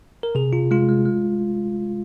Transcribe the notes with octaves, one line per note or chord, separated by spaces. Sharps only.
A#4
C3 G#4
C3 F4
G#3 F4
G#3
G#3